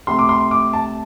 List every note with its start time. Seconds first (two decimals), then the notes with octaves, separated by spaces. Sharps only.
0.07 C3 A3 C6
0.19 D6
0.29 C6
0.51 D6
0.73 A5